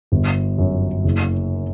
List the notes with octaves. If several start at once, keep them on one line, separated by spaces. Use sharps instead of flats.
G1
F#2
F#1